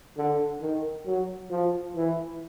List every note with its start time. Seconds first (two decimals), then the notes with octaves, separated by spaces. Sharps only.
0.17 D3
0.61 D#3
1.06 F#3
1.50 F3
1.95 E3